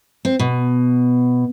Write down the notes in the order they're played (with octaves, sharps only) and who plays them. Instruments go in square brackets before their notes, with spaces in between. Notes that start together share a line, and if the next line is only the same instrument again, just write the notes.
[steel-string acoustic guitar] C4
B2